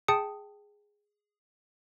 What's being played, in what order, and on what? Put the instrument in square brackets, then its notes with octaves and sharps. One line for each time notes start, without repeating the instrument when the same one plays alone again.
[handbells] G#4 G5 A5 D#6 C#7